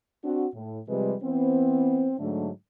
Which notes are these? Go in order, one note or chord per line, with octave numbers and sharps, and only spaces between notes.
C4 D4 F#4
A2
C3 F3 G3 G#3 B4
E3 B3 C4
G#2 D3 F#3 A3